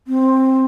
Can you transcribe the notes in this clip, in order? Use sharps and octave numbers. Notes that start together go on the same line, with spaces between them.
C4